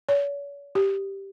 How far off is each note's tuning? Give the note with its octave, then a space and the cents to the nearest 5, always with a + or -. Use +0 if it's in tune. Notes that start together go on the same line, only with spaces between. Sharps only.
C#5 +40
G4 +0